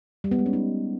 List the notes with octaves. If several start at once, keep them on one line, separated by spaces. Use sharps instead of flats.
G3
B3
G#3
C#4
D#4